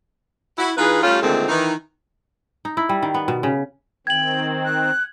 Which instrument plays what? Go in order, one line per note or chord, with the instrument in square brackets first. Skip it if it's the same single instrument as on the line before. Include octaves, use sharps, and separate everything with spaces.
[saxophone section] E4 F#4
E3 D#4 F4 G#4 B4
G3 A3 C#4 F4 G4 A4
A#2 D3 D#3 G#3 A3 C4
D#3 E3 D#4
[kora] D#4
E4
G3
D#3
B3
B2
C#3
[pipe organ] D#3 C4 [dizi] G5 [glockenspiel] G#6 F#7
[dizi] F#6